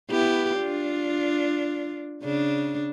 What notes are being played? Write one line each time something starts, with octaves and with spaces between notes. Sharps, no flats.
B3 E4 G4
D4 F4
C#3 D4